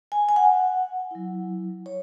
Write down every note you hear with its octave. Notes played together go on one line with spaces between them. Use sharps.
G#5
G#5
F#5
F#3 E4
C#5